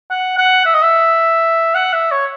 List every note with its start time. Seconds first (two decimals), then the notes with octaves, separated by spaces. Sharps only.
0.11 F#5
0.38 F#5
0.65 E5
0.74 D#5
0.83 E5
1.75 F#5
1.93 E5
2.11 C#5